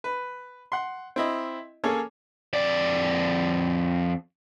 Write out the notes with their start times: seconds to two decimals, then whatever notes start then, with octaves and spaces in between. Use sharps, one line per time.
0.04 B4
0.72 F#5 C6
1.16 C4 E4 D#5
1.84 A#3 C#4 G#4 A4 C#5
2.53 F2 D5